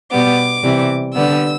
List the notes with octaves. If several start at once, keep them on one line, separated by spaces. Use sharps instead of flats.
B2 G3 B3 D6
C3 E3 G3
D3 G3 B3 E6